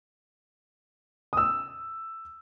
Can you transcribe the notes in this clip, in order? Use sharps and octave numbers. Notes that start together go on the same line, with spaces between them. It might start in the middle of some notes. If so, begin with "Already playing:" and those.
D#6 E6